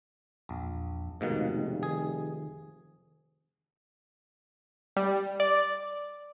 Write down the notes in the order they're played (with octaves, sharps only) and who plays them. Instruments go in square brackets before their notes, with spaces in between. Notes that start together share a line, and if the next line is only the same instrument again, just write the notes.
[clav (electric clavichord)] A#1 [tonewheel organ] E2
[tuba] F1 [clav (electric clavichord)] G#2 B2 D#3 [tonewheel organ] A3 F5
[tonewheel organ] D#3 [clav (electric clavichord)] G#4
[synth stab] G3
D5